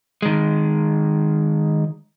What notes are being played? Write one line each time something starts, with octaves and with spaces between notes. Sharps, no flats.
D#3 G#3